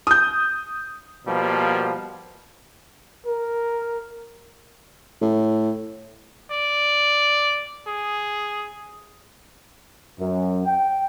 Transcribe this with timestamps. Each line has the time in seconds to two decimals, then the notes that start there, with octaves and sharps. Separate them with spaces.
0.07 D#6 G6
1.26 B2 F3 G3 A#3
3.26 A#4
5.22 A2
6.51 D5
7.87 G#4
10.19 F#2
10.66 G5